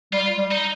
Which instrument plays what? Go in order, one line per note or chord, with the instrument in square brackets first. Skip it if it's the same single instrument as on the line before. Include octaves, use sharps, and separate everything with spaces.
[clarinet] G3 [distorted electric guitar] F4
[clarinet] G3
[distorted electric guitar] D#4